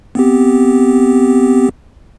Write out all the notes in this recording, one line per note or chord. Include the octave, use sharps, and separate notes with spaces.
B3 C4 G4